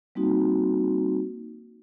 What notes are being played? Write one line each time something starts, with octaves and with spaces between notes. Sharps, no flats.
G3 A#3 C4 D#4 F#4